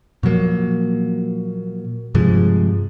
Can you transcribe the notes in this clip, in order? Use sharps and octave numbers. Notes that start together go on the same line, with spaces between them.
A#2 F3 F#3 A#3
G2 C3 F3 G#3